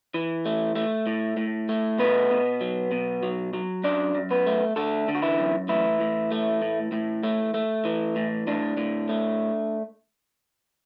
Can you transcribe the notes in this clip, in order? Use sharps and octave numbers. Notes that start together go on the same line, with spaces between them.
E3
A3
A3
A2
A2
A3
B2 B3 B4
B2
F#3
B2
F#3
F#3
F#2 D4 D5
F#2
B3 B4
A3
D3 A3 A4
D3
F#4
E3 E4
F#2
A2 E3 E4
A2
A3
A2
A2
A3
A3
E3
A2
A2 D4
A2
A3